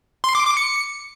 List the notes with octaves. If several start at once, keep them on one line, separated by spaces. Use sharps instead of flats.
C6
D6
D6
C#7